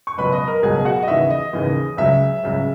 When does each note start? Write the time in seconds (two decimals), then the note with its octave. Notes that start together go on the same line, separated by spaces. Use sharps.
0.07 C#6
0.18 C#2 B2 F#3 B4 B5
0.33 D#5
0.48 A#4 A#5
0.62 C#2 B2 F#3 G#4 G#5
0.85 F#4 F#5
1.03 D#5
1.07 D#2 C#3 E3 E5
1.30 D#5
1.53 D#2 C#3 E3
1.97 C#2 C#3 F#3 E5
2.43 C#2 C#3 F#3